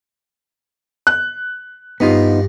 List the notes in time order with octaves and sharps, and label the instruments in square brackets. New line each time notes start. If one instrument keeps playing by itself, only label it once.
[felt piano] F#6
[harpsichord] G2 F3 [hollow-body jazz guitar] B3 D#4 F4